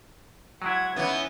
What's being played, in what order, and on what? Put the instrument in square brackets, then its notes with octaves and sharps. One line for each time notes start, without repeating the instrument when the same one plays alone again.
[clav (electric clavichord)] F#3 G#3 E4 [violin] F#5 G#6
[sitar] E3 B3 [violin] C#4 D#4